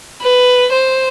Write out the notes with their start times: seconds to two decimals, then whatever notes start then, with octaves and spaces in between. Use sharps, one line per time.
0.22 B4
0.72 C5